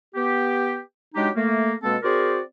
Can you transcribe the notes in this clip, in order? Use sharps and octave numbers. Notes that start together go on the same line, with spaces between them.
B3 G4
F#3 G#3 D4 D#4 G4
A3 A#3
B2 G#3 A#3 C4 A4
C4 F#4 G#4 A#4 C5 D5